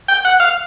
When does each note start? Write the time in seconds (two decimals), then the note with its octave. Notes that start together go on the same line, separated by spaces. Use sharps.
0.08 G5
0.25 F#5
0.40 F5